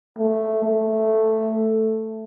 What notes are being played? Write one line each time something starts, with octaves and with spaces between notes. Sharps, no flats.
A3
A3